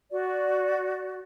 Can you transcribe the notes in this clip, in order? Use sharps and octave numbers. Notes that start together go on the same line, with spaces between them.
F#4 D5